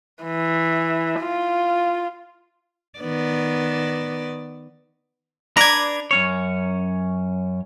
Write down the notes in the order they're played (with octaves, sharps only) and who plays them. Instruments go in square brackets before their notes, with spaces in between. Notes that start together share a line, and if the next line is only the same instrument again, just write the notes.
[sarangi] E3
F4
[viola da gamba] D#3 B3 D5
[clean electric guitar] D4 B4 D5 [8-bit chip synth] A#5 G#6
[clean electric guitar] F#2 C#4 C#5